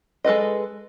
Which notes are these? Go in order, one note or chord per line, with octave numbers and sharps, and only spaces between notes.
G#3 A4 B4 D#5